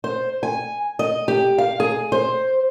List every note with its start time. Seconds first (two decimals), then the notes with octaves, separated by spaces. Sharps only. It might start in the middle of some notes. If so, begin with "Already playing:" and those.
0.04 C5
0.43 G#5
0.99 D#5
1.28 G4
1.58 F5
1.80 G#4
2.12 C5